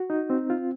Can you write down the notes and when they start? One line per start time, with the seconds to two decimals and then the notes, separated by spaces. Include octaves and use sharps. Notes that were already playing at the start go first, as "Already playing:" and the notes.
Already playing: F#4
0.10 D#4
0.30 C4
0.50 F4